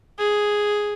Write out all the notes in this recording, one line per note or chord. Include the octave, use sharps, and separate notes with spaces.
G#4